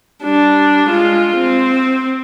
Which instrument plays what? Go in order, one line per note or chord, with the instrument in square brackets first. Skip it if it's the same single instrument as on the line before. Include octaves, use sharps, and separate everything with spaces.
[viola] G3 D4
G#3 F4
C4